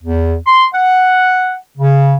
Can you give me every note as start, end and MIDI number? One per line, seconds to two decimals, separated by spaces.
0.04 0.36 40
0.46 0.66 84
0.73 1.54 78
1.78 2.16 49